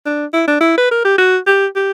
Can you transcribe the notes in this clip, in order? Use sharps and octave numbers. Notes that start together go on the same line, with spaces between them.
D4
E4
D4
E4
B4
A#4
G4
F#4
G4
G4